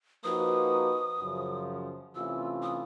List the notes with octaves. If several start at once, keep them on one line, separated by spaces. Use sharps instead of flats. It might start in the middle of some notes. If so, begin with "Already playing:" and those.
F3 A#3 D#4 F#4 B4 D#6
F#2 C#3 F3
C3 E3 A3 C#4 F4 E6
D#6